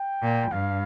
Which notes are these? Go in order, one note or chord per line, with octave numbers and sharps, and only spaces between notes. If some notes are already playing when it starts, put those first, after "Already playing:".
Already playing: G5
A#2
G2 F5